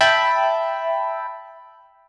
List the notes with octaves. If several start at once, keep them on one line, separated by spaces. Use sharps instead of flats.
E5 G5 A5 B5